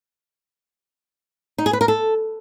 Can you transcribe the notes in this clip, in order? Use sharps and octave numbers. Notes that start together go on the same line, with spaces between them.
D#4
G#4
B4
A#4
A4